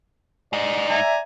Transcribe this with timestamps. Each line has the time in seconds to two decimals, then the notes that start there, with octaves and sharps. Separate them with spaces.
0.53 G#2 D5 D#5
0.90 E5 G#5 A#5